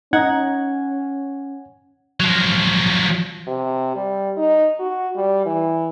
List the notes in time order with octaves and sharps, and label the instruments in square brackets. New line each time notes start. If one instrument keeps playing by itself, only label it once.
[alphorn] C#4 [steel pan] D#4 [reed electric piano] F#5 G#6
[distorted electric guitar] F3 F#3
[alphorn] C3
G3
D#4
F#4
G3
E3